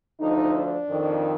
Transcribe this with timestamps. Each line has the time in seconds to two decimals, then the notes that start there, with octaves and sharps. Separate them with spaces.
0.19 D2 D3 F3 D#4
0.54 D4
0.90 F2 D#3